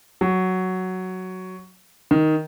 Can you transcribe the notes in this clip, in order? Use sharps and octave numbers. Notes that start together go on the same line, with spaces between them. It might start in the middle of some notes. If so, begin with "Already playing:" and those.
F#3
D#3